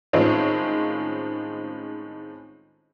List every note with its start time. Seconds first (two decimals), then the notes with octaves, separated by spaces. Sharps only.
0.13 A2 D#3 G#3 C4 C#4 F4